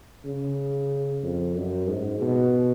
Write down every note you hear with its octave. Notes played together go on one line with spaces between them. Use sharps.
C#3
F2
F#2
G#2
B2